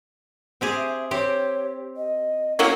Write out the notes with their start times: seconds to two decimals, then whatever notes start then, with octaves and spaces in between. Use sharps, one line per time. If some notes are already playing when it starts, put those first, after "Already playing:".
0.61 C4 G4 G#4
0.76 E5
1.11 C4 G4 C#5
1.97 D#5
2.59 F#3 A#3 C#4 E4